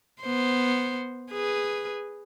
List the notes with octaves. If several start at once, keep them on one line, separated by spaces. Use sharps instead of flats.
B3 C5
G#4 B4